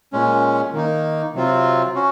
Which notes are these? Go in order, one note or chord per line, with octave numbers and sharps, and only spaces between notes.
A#2 G#3 C#4
D#3 A#3 D#4
C3 F#3 C4 F4
C#4 F#4